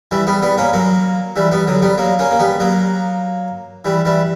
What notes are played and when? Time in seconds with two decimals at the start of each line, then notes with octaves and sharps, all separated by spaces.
0.11 E3 G3
0.27 G3 B3
0.42 G3 B3
0.58 A#3 C#4
0.73 F#3 A#3
1.36 E3 G3
1.51 G3 B3
1.67 D3 F#3
1.82 G3 B3
1.98 F#3 A#3
2.19 A#3 C#4
2.31 A#3
2.39 G3 B3
2.60 F#3 A#3
3.85 E3 G3
4.05 E3 G3